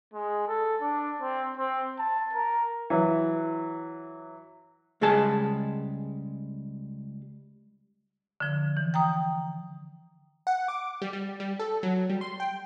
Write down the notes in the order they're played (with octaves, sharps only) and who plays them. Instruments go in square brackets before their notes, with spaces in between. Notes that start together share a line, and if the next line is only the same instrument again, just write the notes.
[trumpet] G#3
A4
D4
C4
C4
A5
A#4
[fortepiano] E3 F#3
[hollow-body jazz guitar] C#2 G3 G#3 G#4 A5
[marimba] D3 F3
E3
G5 A#5 D#6
[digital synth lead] F#5
D6
G3
G3
G3
A4
F#3
G3
C6
G5